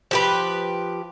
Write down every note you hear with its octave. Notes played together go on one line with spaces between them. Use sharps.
F3 G4 B4